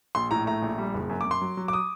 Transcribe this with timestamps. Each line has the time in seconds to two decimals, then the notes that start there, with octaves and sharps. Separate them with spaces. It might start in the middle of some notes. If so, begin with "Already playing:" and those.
0.15 A#1 C6
0.31 A2 A#5
0.46 A3 A#5
0.62 A#1
0.78 G3
0.94 F#1
1.10 F#2
1.21 D6
1.25 F#2
1.31 C6
1.42 F#3
1.57 F#3
1.68 D6
1.73 D#6